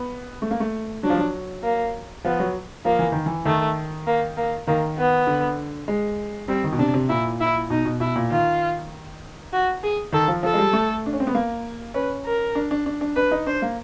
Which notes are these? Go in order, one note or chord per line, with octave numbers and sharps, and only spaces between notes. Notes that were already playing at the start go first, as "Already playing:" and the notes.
Already playing: B3
A3
A#3
A3
F#3 D4
F3
F#3
A#3
F3 B3
F#3
F3 A#3
E3
D#3
E3
D#3 A3
A#3
A#3
D#3 A#3
B3
D3
G#3
G3 C4
D#3
B2
C3 D4
C3
A#2 E4
E4
B2 D#4
B2
B2 E4
A#2
D#3 F4
F#4
G#4
D#3 A4
F3
F3 A4
G#3
G3
A3
D4
C#4
C4
B3
A#3
C#4 B4
A#4
D4
D4
D4
D4
D4 B4
D#4
D4 C5
A#3